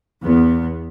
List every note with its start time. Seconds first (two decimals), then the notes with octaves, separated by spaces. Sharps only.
0.22 E2 B3